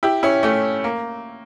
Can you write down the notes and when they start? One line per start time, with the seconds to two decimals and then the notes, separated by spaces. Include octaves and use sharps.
0.03 E4 G4
0.23 C#4 E4
0.43 A3 C#4
0.84 A#3